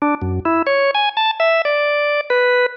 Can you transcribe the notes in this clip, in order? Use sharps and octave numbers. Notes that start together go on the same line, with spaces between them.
D4
F#2
E4
C#5
G#5
A5
E5
D5
B4